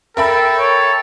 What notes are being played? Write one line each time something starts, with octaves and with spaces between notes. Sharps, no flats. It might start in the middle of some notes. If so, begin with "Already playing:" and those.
A4 A#4 E5 G5 B5
C#5